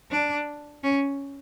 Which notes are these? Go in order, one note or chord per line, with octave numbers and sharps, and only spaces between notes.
D4
C#4